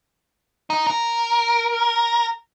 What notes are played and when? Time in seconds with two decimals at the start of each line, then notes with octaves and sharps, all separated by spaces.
0.70 D#4
0.87 A#4